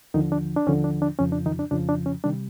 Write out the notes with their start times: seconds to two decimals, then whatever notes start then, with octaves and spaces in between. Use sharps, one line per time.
0.14 D#2 D3 D#3 F3 D#4
0.32 D4
0.56 D4
0.67 D#2 D3 F3 C#4
0.84 D4
1.02 D4
1.19 F2 C#3 F3 C#4
1.32 D4
1.46 D#3 D#4
1.59 D4
1.71 F2 C#3 F3 D4
1.89 D4
2.06 C#4
2.24 C3 D#3 G3 D4